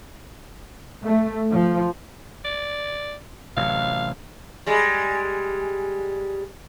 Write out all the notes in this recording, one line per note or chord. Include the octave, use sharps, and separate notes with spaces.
A3
F3
D5
A1 C3 F#3 F5
G3 G#3